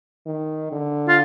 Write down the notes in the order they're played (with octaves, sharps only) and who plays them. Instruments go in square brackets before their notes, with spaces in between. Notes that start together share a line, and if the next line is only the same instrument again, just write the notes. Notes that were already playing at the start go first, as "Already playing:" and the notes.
[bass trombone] D#3
D3
[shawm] F4